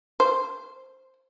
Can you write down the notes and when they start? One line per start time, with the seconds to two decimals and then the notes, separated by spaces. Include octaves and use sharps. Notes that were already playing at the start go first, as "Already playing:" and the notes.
0.20 C5